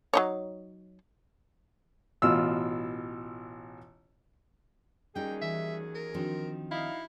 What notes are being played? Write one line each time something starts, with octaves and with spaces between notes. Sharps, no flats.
F#3 D#4 C#5
A1 B2 F4 E6 F6
D#2 F#3 G3 C#4 D#4 G#4 G5
E3 E5 G#5 G#6
A#4
D#3 F3 C4 D4 F#4
D#4 E4 F5